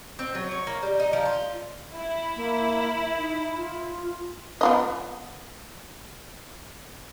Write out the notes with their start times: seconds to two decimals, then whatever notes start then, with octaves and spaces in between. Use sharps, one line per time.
0.19 C4
0.35 F#3
0.51 C#5
0.67 A#3
0.83 G3
1.00 D#4
1.13 F3
1.26 F4
1.93 E4
2.36 A#3
3.17 D#4
3.56 F4
4.61 B3 F4 D#5